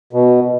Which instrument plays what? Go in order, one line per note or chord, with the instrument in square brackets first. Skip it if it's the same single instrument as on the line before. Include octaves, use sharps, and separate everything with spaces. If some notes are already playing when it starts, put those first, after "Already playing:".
[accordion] B2